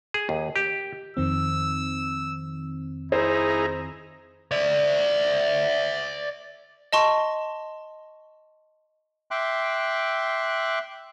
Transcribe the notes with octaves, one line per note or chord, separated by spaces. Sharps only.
G#4
D#2
G4
F2 D#3 C4 E6
D#4 E4 G#4 C5 A#5
D5 E5
D#5 A5 C6 C#6
E5 G5 C6 D6 F#6